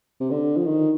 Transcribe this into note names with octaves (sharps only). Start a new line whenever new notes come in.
C3
D3
F3
D#3